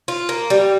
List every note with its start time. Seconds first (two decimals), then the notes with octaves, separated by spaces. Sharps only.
0.08 F4
0.29 A#3
0.50 G3